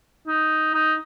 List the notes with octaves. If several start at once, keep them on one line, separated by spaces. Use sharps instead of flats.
D#4
D#4